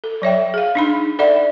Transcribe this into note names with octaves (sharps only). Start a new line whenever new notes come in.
A4
F#3 C#5 E5 G5
G#4 F5
D4 D#4 B5
A4 D5 E5 F#5 B5